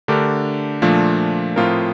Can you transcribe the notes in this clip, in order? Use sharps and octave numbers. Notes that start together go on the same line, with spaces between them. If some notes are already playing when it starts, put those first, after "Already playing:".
D3 A3 D4 G4 A#4
A#2 F3 A3 D4
A2 F3 C4 F4 A#4